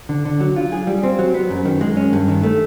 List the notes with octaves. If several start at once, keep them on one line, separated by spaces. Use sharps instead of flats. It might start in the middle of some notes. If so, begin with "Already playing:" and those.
D3
D3
F#3
F4
G#4
G3
C4
F#3
B3
F#2
D#3
G#3
C#4
G2
D#3
A3